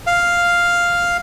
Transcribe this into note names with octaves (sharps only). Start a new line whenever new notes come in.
F5